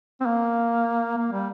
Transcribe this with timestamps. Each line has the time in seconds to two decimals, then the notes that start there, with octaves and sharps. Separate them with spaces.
0.20 C4
0.26 A#3
1.18 A#3
1.32 G3